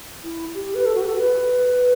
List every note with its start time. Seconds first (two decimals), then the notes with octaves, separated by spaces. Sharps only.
0.24 E4
0.54 G4
0.75 B4
0.86 A4
0.95 F#4
1.02 G4
1.09 A4
1.17 B4